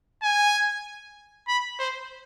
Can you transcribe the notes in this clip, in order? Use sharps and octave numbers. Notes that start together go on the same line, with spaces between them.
G#5
B5
C5